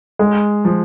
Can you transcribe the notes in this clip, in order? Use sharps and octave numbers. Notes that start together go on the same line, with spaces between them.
G#3
F3